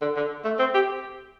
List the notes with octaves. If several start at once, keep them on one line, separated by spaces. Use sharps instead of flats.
D3
D3
A3
C4
G4